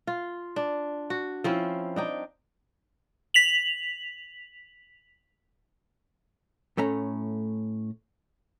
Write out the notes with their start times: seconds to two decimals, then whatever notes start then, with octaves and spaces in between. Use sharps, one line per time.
0.07 F4
0.56 D4
1.10 F#4
1.44 F3 C4 C#4 E4
1.96 D4 D#4 G5
3.34 B6 F7 F#7
6.77 A2 A3 C#4 A#5